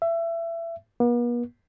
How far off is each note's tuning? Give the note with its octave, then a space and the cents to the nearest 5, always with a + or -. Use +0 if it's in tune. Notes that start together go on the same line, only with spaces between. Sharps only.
E5 +25
B3 -45